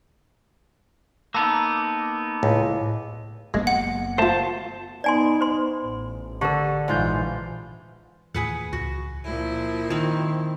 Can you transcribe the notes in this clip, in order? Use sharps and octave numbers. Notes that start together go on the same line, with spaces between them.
A#3 B3 D#4 A5 D6 E6
C#2 A2
F#1 G#3 A#3 B3
F#5
A3 F4 C5 A5
B3 D#4 D5 G#5 C6
C5 C6
A1
D3 G4 A#4
A#1 G#2 E3 F4 G6
D#2 A2 E3 G#4 B4 F#5
C#2 F#4
A#2 F3 E4
D#3 C4